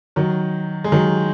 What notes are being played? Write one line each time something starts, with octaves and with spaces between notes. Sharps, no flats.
D#3 F#3
G#3
D#3 F#3